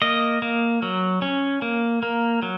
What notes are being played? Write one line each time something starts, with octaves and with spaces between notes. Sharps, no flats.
A#3 D#5
A#3
F#3
C#4
A#3
A#3
F#3